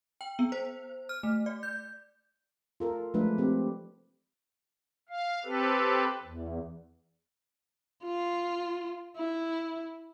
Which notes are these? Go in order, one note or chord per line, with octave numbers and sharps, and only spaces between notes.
G5
B3
C5
F6
A3
D5
G6
F4 A4 A#4
F3 G#3 A3 D4 B4
C4 G4
F5
C4 G4 A4 B4
E2
F4
E4